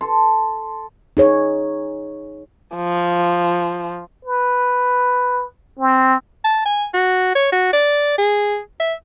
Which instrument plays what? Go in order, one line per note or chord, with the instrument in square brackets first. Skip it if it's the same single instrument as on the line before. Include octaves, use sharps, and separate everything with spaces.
[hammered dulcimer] A4 C6
[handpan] D#4 G#4 C#5
[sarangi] F3
[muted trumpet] B4
C4
[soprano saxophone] A5
G#5
F#4
C#5
F#4
D5
G#4
E5